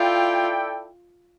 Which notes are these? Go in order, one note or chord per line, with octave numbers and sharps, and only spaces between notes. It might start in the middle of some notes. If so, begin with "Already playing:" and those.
Already playing: E4 F4 A4 D5 G5